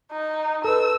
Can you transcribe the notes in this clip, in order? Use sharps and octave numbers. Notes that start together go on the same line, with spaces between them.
D#4
A4 B4 E6